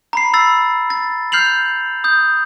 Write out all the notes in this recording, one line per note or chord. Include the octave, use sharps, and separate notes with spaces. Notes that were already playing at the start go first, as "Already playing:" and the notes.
A#5 B5 C7
B5 E6 A6 C7
A6
F6 G6 C7 F7 F#7
D#6 G6